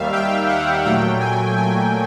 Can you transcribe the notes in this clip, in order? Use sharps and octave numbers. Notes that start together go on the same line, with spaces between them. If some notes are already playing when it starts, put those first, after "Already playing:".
Already playing: D#2 D#3 G3 E5 F5
G5
F#5
A#2 F#3 A3 G5
G#5
G#5